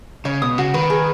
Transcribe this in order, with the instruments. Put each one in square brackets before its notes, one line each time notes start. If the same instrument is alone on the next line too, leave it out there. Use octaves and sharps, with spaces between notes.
[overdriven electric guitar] C#3 [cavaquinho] C#5
[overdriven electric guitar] B2 [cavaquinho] D#6
[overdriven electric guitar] C#3 [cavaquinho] F#4
[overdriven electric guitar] D#3 [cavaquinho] B4
[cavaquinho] G#4